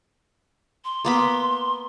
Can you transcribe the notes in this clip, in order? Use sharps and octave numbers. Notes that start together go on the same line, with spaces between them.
C6
A#3 B3 B5